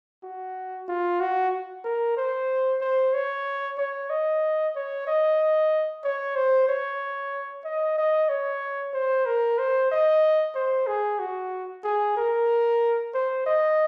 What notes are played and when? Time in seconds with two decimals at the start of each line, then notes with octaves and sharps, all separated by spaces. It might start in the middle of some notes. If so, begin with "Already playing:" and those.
0.23 F#4
0.88 F4
1.20 F#4
1.84 A#4
2.17 C5
2.81 C5
3.14 C#5
3.78 C#5
4.10 D#5
4.75 C#5
5.07 D#5
6.04 C#5
6.36 C5
6.69 C#5
7.65 D#5
7.98 D#5
8.29 C#5
8.94 C5
9.26 A#4
9.58 C5
9.91 D#5
10.55 C5
10.87 G#4
11.19 F#4
11.84 G#4
12.17 A#4
13.14 C5
13.46 D#5